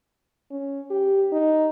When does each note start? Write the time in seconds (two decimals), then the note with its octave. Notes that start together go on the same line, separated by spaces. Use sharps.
0.51 C#4
0.90 G4
1.32 D#4